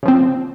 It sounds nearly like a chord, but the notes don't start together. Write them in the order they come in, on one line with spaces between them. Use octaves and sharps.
C#3 F3 C4